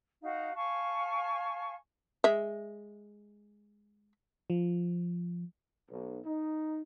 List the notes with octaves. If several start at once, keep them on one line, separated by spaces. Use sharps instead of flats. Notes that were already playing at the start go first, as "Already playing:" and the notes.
D#4 F#4 F5
F5 G#5 A5 C#6
G#3 E5
F3
B1
D#4